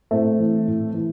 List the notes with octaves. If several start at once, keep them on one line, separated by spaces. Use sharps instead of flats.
A2 A3 C4
E3
A2
E3